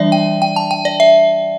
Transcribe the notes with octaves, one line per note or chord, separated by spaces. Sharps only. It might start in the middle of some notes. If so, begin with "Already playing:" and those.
Already playing: E3 G3 D4 D5 E5
G5
G5
A5
G5
D5
E5